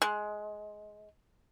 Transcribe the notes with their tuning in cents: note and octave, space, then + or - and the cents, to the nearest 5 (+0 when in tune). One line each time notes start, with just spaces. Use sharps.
G#3 +15